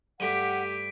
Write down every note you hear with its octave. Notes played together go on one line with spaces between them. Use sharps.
G2 A3 G4 F#5 B6 D7 D#7